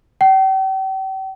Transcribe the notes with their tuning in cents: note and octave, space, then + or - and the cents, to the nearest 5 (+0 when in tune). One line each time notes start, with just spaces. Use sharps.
G5 -40